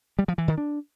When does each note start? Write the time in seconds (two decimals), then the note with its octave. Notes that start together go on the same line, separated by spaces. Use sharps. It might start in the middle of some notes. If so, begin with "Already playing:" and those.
0.19 G3
0.28 F3
0.38 E3
0.48 D#3
0.58 D4